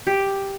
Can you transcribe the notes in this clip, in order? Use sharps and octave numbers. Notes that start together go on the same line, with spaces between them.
G4